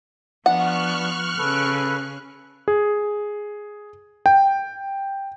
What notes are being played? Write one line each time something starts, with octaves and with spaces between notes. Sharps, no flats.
F3 B3 D4 F#5 C#6 F6 F#6
C#3 A4 B4
G#4
G5